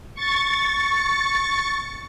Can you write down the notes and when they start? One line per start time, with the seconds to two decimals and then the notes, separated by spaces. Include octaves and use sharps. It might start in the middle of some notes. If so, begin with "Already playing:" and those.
0.15 C#6 A6